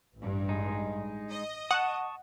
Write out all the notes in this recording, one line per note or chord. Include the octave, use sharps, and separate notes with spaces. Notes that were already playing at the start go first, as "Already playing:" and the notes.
A1 G2
G#3 D#4
D#5
F#5 A5 C#6 D#6